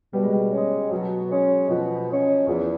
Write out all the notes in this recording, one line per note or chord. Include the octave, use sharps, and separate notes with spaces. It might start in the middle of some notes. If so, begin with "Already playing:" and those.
B2 G3
G#3
G3
G#3 C#4
B2 F#3
G#3 C#4
B2 F3
G#3 C#4
E2 F3